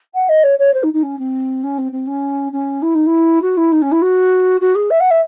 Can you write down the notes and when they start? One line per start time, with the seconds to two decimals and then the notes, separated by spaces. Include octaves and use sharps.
0.14 F#5
0.29 D#5
0.43 C#5
0.59 C#5
0.73 C5
0.83 D#4
0.93 D#4
1.02 C#4
1.19 C4
1.63 C#4
1.78 C4
1.92 C4
2.07 C#4
2.52 C#4
2.82 E4
2.94 D#4
3.06 E4
3.42 F#4
3.57 E4
3.72 D#4
3.82 C#4
3.91 E4
4.01 F#4
4.60 F#4
4.75 G#4
4.90 E5
5.00 F#5
5.10 E5